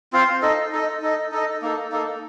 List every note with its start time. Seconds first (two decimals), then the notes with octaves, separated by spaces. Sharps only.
0.13 C4 F4 C5 F5
0.42 D#4 A4 D#5
0.72 D#4 A4 D#5
1.02 D#4 A4 D#5
1.32 D#4 A4 D#5
1.62 A#3 D#4 A4
1.92 A#3 D#4 A4